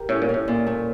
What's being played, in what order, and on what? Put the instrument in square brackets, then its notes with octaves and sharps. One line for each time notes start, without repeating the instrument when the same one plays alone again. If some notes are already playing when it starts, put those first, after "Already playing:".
Already playing: [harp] G4 A#4
[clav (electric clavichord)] A2 [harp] C#4
[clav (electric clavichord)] A#2
[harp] C#4
[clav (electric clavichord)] A2
[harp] A#2
A3